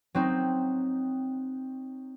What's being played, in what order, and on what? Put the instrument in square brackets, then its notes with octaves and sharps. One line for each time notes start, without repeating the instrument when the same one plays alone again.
[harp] F#3 C4 D#4